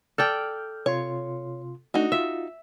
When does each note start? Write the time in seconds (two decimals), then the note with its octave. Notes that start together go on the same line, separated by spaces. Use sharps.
0.18 A4 D5 G5 F6 G6
0.86 C3 F4 C#5 C6
1.94 A3 D4 D#4 F#4
2.12 F4 E5